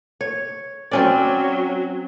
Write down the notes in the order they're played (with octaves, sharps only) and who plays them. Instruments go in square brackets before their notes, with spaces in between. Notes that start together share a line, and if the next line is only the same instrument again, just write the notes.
[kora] C#5
[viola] F#3 [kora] C4 C#4 D5